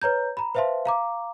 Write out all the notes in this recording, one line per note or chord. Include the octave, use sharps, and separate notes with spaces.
B4 C#5 A#5 G6
A#5 B5
B4 C5 E5 F5 A5 C6
F5 A#5 D6